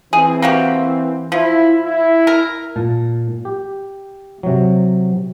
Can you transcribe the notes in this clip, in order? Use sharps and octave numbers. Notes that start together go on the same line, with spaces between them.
E3 C4 G#4
A#3 F#4 G4
F3 E4
E4
A#4
A#2 A5
G4
C3 F#3